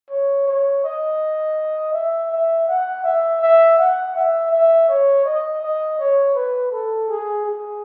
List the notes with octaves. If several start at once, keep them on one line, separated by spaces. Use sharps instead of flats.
C#5
C#5
D#5
E5
E5
F#5
E5
E5
F#5
E5
E5
C#5
D#5
D#5
C#5
B4
A4
G#4
G#4